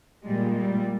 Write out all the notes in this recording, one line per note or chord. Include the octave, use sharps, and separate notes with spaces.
A#2 G3 G#3
G3